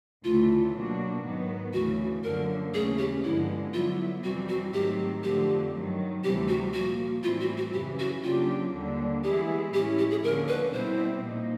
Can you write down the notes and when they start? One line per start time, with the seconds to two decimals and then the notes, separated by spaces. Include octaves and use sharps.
0.24 D2 C#3 E3 A3 F4
0.74 B2 F#3 A#3 D4 F#4
1.23 G#2 D#3 F#3 B3
1.73 D2 C#3 E3 A3 F#4
2.24 F#2 D3 F3 A#3 A#4
2.74 D#2 C#3 E3 A3 C#4 G#4
2.99 G4
3.24 G2 D3 F3 G#3 B3 E4
3.74 D3 F#3 B3 E4 F4
4.24 F2 C3 E3 G3 C4 F#4
4.49 F#4
4.73 G#2 D#3 F#3 A3 C4 G4
5.23 F2 D3 F3 A3 C4 G4
5.73 G2 D#3 F#3
6.24 D2 C3 E3 G3 C4 G4
6.48 F#4
6.74 A#2 F3 A#3 F#4
7.23 A2 E3 G3 C4 E4 F4
7.41 F#4
7.57 F#4
7.73 F#2 C#3 E3 G4
7.99 F#4
8.23 C#3 F#3 A#3 D4 F4 G4
8.73 D#2 D3 G3 A#3 D4
9.24 E3 G#3 B3 E4 G4 G#4
9.73 A2 E3 G#3 C#4 E4 G4
9.99 G4
10.11 G#4
10.24 D#2 D3 F3 G#3 C#4 A#4
10.48 B4
10.73 B2 G3 C4 E4 C5
11.24 A#2 F3 A#3 D#4